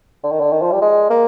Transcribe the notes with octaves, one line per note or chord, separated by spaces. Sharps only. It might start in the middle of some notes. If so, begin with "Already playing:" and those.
D3
D#3
D3
D#3
F3
G3
G#3
A#3